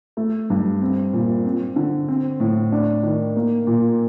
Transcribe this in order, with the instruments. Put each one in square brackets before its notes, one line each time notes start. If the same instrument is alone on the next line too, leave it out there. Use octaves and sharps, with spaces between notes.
[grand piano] A3
G2
C4
A#2
C4
D3
C4
A2
D4
D#3
A#3
A#2